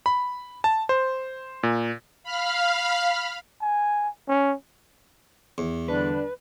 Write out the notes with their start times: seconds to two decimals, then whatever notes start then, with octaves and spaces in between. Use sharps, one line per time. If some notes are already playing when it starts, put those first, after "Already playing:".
0.06 B5
0.64 A5
0.89 C5
1.63 A#2
2.24 F5 B5 F6
3.61 G#5
4.28 C#4
5.58 E2
5.88 D3 G3 D4 B4